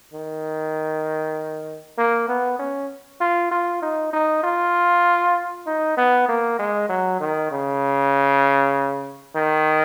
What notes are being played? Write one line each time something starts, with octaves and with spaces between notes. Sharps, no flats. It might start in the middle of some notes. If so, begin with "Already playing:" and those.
D#3
A#3
B3
C#4
F4
F4
D#4
D#4
F4
D#4
B3
A#3
G#3
F#3
D#3
C#3
D#3